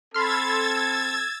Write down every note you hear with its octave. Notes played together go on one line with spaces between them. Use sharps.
C4 A4 B5 C6 E6 F6 G#6 A6